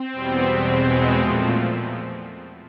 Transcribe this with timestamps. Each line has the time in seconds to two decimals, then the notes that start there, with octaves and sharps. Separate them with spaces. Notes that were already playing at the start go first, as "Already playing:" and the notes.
Already playing: C4
0.13 E2 B2 G3 B3
0.47 E2 B2 G#3 C4
0.82 E2 B2 G#3 B3
1.16 A#2 F3 A3